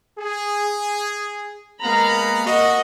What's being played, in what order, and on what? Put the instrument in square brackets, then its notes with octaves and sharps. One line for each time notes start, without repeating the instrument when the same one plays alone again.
[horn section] G#4
[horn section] G#3 B3 F5 [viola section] A#3 A#5 B5
[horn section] F#4 [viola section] A#4 D#5